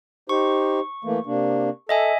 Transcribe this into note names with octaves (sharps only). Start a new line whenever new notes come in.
D#4 G4 C5 C#6
E3 A3 A#3
C3 A#3 D4
A4 D#5 E5 G#5